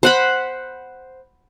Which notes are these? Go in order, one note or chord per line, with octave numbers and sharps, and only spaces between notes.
C5 F#5 B5